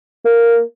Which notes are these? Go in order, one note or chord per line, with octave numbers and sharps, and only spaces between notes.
A#3